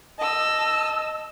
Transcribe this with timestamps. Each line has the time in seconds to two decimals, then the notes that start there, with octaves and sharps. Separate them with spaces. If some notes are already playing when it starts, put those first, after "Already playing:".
0.19 D#5 A5 E6